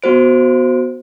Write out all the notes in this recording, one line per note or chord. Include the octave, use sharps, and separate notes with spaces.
B3 F#4 C5 D7